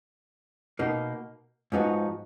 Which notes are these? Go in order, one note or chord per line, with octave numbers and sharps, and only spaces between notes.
B2 A#3 D#4
G#2 F3 B3 D#4 F#4